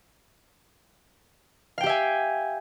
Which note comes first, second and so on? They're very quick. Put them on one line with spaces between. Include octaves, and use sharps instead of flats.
F5 G5 G4 E5 G#5